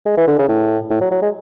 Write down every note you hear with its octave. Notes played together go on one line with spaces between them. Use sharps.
G#3
E3
D3
C#3
A2
A2
F#3
F#3
G#3